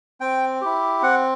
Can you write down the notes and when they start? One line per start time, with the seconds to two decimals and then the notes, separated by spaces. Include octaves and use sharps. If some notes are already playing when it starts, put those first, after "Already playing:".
0.21 C4 G5
0.61 E4 G4
1.02 C4 F#5